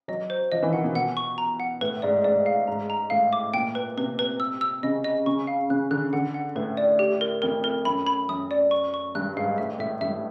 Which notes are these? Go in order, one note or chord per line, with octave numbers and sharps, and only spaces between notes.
F#3 D#5
C5
F3 D#5
E3
D#3 F#5
B2
B2 F#5
C#6
A#5
F#5
A2 B4
G#2 D5
G#2 D5
F5
G#2 A#5
A#5
A2 F5
D6
A#2 G5
B4
C3 B4
B4
E6
E6
C#3 D#5
D#5
C#3 C#6
F5
C#3 F#6
D3 F#6
D3 F#5
F#5
A2 B4
D5
G4
A#4
F2 A#4
A#4
F#2 B5
B5
F#2 D#6
D5
C#6
C#6
G2 F#6
G#2 F5
A2 E5
A2 E5
G2 E5